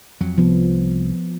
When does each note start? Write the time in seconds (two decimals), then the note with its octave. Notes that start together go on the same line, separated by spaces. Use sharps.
0.21 F2 F#3
0.38 C2 F3 B3